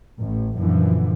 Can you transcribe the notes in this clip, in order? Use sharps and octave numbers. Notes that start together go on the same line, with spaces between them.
A1
F#2 A#2 D3 E3 F3